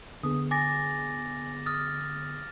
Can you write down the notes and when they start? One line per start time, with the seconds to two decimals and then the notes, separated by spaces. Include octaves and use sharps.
0.23 D3 B3 G#4 D#6
0.51 G#5 D6 A6 A#6
1.66 D#6 F6 A6